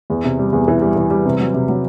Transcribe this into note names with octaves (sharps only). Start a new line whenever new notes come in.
E2
C3
G3
E2
E3
G3
E3
G3
C3
F#3
C3
F#3